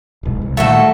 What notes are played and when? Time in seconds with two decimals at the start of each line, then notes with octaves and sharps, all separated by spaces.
0.23 D1 B1 G#2
0.42 C2
0.57 A#2 D#3 G3 A3 F#4 A4